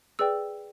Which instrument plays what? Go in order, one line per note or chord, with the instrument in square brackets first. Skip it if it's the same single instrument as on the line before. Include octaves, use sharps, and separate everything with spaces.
[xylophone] G#4 B4 D5 G5 E6